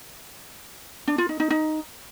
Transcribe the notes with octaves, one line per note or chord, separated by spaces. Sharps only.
D4
F4
D#4
D#4
D#4